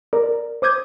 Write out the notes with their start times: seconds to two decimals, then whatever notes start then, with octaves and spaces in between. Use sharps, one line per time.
0.13 A#4 D5
0.62 C5 D6 D#6 G6 G#6